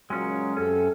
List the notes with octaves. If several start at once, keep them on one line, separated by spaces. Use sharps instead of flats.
A#2 C#3 F#3 G#3 C#4
F#2 C4 C#4 G4 A4